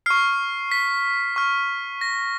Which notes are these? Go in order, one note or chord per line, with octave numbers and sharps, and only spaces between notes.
C#6 F6 C7
B6
C#6 F6
A#6